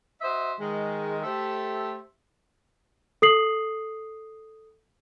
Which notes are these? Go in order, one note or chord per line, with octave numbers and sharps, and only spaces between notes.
F#4 C5 D#5 E5
D#3 G#3
A3 G4 A4 C5 E5
A4 D#6 C7 F#7